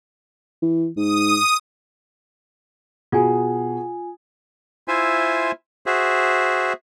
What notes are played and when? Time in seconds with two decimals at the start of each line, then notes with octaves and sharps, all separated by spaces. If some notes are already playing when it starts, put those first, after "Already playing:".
0.62 E3
0.97 G#2 D#6
3.12 B2 F4 G#4 G#5
4.88 E4 F4 C5 E5 G#5
5.86 F#4 G#4 C5 E5